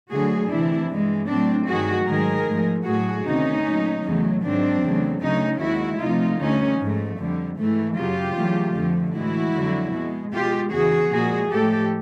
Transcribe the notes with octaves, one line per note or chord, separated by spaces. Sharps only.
D2 D3 F#3 A3 F#4 G#4
D2 C3 E3 D4 E4
G2 E3 G#3
A2 F#3 A3 C4 D4
G2 D#3 F#3 A3 F#4 G#4
G#2 D#3 F#3 G#4 A#4
G#2 F3 A3
A2 F#3 A3 F#4 G#4
D2 C3 D#3 C#4 D#4
A#2 F#3 A3
E2 C#3 F#3 A3
G#2 D#3 F#3 C4 D4
E2 C#3 F#3 A3
D2 C#3 F#3 A3 C#4 D#4
D#2 D#3 G#3 E4 F#4
D2 C3 F3 A3 D#4 F4
D2 D3 G3 C#4 D#4
G#2 F3 A3
F2 D3 G3
G#2 E3 A3
F#2 C#3 F#3 F4 G4
E2 C#3 F#3 A3
F2 D3 F3 A3
A2 E3 G#3 E4 F#4
F2 D3 F#3
B2 G#3
B2 G#3 F4 G4
E2 C#3 E3 F#4 G#4
A#2 F3 G#3 F#4 G#4
A2 F3 G#3 G4 A4